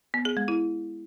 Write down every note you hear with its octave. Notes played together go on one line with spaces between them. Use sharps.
B3
G#4
G#3
E4